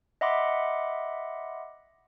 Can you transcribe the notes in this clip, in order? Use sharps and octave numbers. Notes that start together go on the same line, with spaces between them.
D#5 E5 F#5 B5 C6 D6